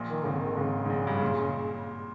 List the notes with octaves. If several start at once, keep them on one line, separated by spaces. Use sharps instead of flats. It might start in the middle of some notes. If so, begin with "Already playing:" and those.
Already playing: A#1 A#2
D#3
G#1 G#2 C#3
D#3
G#1 G#2 C#3
G#2
A#1 A#2
G2
A#2